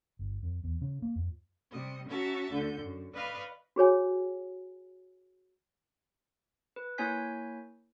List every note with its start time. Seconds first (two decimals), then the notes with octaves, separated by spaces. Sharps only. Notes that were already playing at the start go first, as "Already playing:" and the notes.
0.19 G1
0.43 F2
0.64 E2
0.81 C#3
1.02 A#3
1.15 F2
1.72 C3 G3 D#5
2.08 C#4 F#4 E5 A5 A#5
2.51 D2 D3 G6
2.80 F#2
3.13 B4 D5 D#5 F5 B5 C#6
3.76 F#4 G#4 C#5 G#5
6.76 B4
6.98 A#3 E4 C#5 G#5 G6 B6